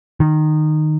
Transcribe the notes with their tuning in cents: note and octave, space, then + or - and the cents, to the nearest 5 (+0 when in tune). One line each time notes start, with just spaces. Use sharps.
D#3 -15